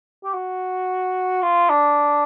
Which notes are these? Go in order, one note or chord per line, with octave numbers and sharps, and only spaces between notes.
G4
F#4
F4
D4